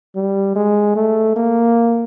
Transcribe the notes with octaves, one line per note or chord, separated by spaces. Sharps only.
G3
G#3
A3
A#3